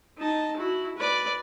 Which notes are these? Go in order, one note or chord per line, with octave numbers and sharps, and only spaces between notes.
D#4 A5
E4 F#4
B4 D5